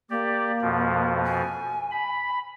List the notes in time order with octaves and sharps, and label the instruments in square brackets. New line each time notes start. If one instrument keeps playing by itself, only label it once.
[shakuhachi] A#3 [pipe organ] G4 D5
[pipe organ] F2 B2 F3
[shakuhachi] G#5
[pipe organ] B5